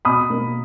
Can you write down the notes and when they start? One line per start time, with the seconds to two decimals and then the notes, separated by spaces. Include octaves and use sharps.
0.05 B2 B5 D#6
0.30 A#3